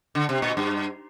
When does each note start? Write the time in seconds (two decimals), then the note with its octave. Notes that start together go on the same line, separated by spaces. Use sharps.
0.15 D3
0.29 C3
0.42 A#2
0.57 G2